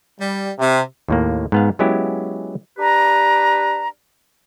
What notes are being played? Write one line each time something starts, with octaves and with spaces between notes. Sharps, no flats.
G3
C3
D#2 A2 A#3
G#2 B3 F5
F#3 G#3 B3 C#4 E4 G4
D4 G4 B4 A#5